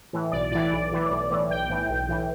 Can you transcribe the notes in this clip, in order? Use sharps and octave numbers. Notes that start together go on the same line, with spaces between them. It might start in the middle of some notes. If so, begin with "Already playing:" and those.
A2 E3
B1 D5
A2 E3 D5
B1
A2 E3
B1
A2 E3
B1 G5
A2 E3
B1
A2 E3